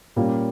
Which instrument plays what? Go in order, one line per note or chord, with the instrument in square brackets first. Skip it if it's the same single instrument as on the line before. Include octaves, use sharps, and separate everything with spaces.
[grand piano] A#2 G3 A#3 C#4 F4